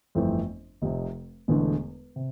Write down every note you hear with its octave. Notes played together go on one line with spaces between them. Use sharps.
G1 F2 E3 A3 C4
F1 F2 C3
E1 E2 D3 A3
C3